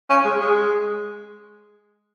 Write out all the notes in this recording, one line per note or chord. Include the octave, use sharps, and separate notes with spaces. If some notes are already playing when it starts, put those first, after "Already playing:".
C#4
G#3
G#3